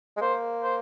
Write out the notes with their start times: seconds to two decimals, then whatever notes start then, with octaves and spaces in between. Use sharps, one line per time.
0.17 G#3
0.21 A#3 C5
0.63 C5